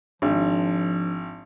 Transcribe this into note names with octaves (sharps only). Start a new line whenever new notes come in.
G#1 F3 D4